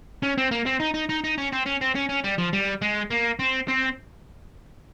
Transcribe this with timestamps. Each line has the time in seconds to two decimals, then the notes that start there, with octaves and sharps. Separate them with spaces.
0.23 C#4
0.38 C4
0.51 A#3
0.66 C4
0.80 D#4
0.94 D#4
1.09 D#4
1.24 D#4
1.38 C#4
1.52 C4
1.66 C#4
1.81 C4
1.95 C#4
2.09 C#4
2.24 G3
2.38 F3
2.53 G3
2.82 G#3
3.11 A#3
3.39 C4
3.68 C4